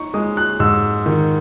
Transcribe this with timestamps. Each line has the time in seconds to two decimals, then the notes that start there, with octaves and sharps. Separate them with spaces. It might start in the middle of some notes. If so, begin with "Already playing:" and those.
Already playing: D#4 C#6
0.14 G#3 D#6
0.37 F#6
0.60 G#2 E6
1.06 D#3